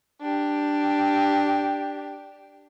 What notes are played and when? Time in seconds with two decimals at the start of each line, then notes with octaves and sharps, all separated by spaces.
0.22 D4 G4